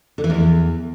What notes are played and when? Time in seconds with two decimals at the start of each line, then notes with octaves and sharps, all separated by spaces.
0.18 D3
0.24 E3
0.30 E2